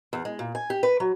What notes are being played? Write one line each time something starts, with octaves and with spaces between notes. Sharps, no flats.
E2
G#3
A#2
G#5
G4
B4
F#3